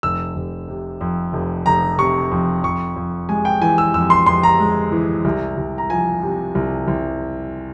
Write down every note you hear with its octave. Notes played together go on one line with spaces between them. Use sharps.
F1 E6
F1
C3
F2
F1
F1 A#5
C3 C#6
F2
F2 C#6
F2
G#3 G#5
G5
E3 G#5
E6
F2 E6
C6
F2 C6
A#5
G#3
E3
C2
C2
A#5
F3 G#5
C3
C2
C2